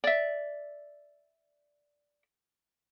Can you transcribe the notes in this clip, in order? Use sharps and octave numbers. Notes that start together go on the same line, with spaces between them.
D5 E5